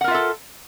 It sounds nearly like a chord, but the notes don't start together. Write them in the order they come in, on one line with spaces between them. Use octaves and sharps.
F#5 A#4 F4 E5 A4